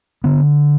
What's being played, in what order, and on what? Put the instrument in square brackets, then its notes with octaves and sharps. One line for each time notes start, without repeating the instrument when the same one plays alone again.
[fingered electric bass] D3 B3